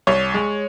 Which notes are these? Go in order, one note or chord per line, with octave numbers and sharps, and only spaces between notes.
C2 C#5
G#3